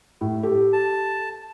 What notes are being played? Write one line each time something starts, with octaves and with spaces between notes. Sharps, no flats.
A2
G4 A4
A5